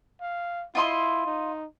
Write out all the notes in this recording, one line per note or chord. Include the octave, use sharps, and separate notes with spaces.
F5
E4 F4 D#5 C6
D#4